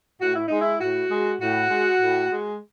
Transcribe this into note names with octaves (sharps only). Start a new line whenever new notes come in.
A2 F#4
E4
G#3 D#4
E4
A2 F#4
G#3
A2 F#4
G#3
A2
G#3